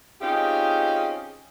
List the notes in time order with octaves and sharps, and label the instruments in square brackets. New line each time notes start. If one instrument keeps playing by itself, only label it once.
[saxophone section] C4 C#4 D#4 F4 G4 G#4